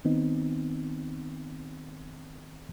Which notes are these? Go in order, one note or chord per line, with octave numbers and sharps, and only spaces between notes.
D#3 B3 C4 D#4